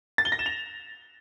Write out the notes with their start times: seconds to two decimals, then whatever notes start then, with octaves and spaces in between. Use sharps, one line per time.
0.18 A6
0.25 G7
0.32 A#6
0.39 E7
0.46 F7